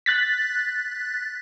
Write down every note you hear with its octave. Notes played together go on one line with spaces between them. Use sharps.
F#6 A6 B6